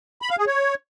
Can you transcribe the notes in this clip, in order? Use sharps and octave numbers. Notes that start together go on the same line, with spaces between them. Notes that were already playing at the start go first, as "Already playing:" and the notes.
B5
F5
G#4
C#5